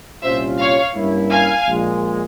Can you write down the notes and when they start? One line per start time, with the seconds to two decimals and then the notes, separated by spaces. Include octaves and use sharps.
0.23 C2 A#2 G3 C#4 F4 C5 E5
0.58 C#5 F5
0.95 G2 G3 A#3 C#4 E4
1.30 F5 G#5
1.66 A#1 A#2 G#3